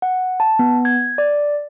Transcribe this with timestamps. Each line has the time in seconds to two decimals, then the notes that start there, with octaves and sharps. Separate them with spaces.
0.02 F#5
0.40 A5
0.59 B3
0.85 G#6
1.18 D5